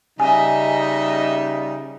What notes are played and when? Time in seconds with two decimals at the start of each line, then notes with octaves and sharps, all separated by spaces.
0.20 C#3 G3 D#4 D#5 E5 G#5